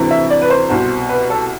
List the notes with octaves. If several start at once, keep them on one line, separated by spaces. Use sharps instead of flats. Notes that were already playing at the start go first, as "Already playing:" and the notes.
Already playing: D2 C3 E3
E5
D5
B4
C5
C2 B2
B4
A4